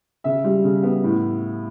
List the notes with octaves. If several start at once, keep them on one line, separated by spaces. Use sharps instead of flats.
C#3 E5
G3
C#3
B3
A2